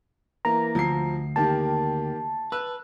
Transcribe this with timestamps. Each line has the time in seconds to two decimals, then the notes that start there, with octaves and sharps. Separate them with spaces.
0.45 E3 A#3 A#5
0.75 D2 F3 C7
1.36 D#3 A#3 G4 A5
2.52 B4 E6